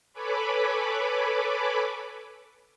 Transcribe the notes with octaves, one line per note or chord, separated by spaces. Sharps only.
A4 B4 C#5 G#5 B5 D6